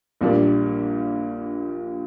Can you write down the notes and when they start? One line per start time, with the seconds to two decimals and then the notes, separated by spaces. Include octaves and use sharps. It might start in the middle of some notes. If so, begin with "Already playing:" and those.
0.21 A#1 A#2 G3 A#3 D4